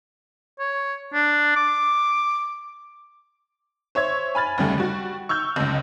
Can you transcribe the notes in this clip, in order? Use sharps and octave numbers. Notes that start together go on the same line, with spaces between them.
C#5
D4
D6
C5 C#5 E5 G#6
G#5 B5 F6 A6
D#2 C#3 G3 A3
G3 F#4
C#6 E6 F6 G6
F#1 C#2